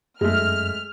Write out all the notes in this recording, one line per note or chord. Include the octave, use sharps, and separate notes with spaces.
F#2 G#3 A3 F6